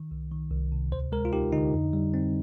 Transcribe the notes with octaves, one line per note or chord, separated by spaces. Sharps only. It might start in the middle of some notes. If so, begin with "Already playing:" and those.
Already playing: D#3
C2
D#3
C2
C3
D2 C5
G#3 A#4
F4
D#4 G4
D3 D#4
F2
G3
C4